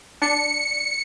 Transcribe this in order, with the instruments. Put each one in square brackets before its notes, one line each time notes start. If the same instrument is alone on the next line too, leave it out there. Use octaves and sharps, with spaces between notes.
[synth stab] D4 [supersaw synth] C#7